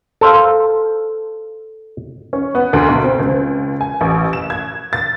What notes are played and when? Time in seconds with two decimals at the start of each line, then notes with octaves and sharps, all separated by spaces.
0.21 A4 C5 F5
2.33 C#4
2.55 B3
2.73 D2
2.88 B1
3.04 C4
3.20 C#2
3.81 G#5
4.01 A1
4.33 E7
4.50 G#6
4.93 A6